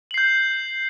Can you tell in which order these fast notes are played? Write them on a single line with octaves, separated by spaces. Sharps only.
F#7 C7 G6